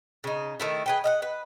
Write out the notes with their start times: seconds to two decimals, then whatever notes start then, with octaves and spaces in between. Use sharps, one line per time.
0.24 C#3 D#4
0.60 D#3 A3 E4
0.86 G#4 B4 G5
1.04 D#5 F5 F#5
1.22 B4